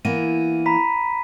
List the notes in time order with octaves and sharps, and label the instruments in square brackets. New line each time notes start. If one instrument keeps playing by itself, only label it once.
[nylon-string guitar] E3 A#3 B3 [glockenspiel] D#7
[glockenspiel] A#5 B5 B6